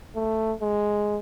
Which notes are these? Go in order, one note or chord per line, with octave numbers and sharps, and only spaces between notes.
A3
G#3